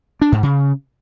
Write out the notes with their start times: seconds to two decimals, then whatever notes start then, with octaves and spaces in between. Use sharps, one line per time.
0.22 D4
0.32 G#2
0.43 C#3